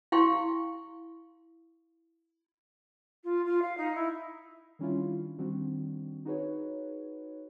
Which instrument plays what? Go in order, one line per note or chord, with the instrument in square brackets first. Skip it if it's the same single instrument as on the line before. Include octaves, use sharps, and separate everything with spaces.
[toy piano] E4 F5 G5 C6 C#6
[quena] F4
F4
F5
D#4
E4
[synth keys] D#3 G3 C#4 D4 E4 F4
D#3 G3 C4 D4 F#4
D#4 F#4 G#4 B4 C#5